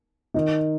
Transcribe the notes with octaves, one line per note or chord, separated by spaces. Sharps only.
D#3 D#4